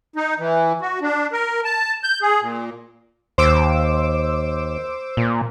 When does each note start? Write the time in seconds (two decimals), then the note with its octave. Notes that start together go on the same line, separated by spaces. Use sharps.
0.16 D#4
0.39 E3
0.81 F#4
1.01 D4
1.32 A#4
1.65 A5
2.03 G6
2.22 G#4
2.41 A#2
3.38 D#2 C5 D6 E6
5.17 A#2